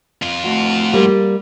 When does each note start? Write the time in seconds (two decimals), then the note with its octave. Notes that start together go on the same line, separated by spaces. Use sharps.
0.22 F2 F4
0.44 A2 F#4
0.94 G3 A#3